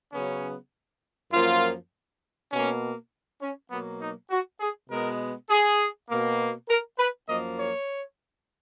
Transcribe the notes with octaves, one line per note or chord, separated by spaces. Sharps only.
C#3 F#3 B3 C#4
F#2 F3 A#3 F4
B2 A#3 C#4
C#4
B2 F#3 A#3 B3
D#4
F#4
G#4
B2 G#3 B3 A#4
G#4
B2 A#3
A#4
B4
F#2 F3 A#3 D#5
C#5